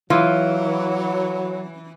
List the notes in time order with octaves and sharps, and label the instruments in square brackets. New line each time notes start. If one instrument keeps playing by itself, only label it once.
[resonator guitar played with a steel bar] E3 [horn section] F#3 [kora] F4